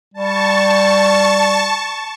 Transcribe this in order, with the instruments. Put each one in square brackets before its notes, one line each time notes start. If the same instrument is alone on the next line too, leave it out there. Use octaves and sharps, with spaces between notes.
[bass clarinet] G3 [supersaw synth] A5 C#6